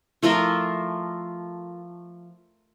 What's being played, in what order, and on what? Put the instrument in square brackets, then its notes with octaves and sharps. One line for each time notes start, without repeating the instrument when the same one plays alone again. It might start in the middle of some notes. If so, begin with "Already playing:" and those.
[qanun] F3 A3 F4 A#4